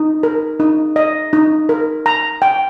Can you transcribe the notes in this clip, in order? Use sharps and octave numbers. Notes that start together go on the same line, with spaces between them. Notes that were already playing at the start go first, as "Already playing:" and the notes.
Already playing: D#4
A#4
D#4
D#5
D#4
A#4
A#5
G5